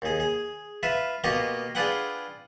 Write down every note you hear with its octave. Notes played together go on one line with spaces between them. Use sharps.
D#2 G#4
G#4
F4 B4 E5
B2 A#3 F4 G4 D#5 C#6
D4 F4 G#4 B4 F#5 G5